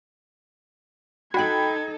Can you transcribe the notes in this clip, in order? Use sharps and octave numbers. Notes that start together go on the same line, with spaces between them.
D#4 F#4 A4 G5 B5 F#6 G#6